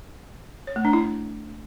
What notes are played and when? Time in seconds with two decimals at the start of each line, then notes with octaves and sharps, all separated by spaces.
0.67 C#5
0.76 A3
0.85 D4
0.93 E4